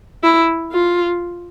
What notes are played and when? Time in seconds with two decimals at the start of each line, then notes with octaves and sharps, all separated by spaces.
0.23 E4
0.72 F4